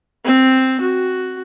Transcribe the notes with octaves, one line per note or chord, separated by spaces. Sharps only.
C4
F#4